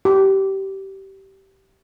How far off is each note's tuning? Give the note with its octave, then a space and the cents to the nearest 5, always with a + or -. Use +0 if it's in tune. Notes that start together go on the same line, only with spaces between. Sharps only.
G4 -20